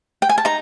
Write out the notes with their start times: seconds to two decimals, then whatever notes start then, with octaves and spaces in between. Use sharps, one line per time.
0.22 G5
0.29 G#5
0.38 A5
0.45 D#4 A#5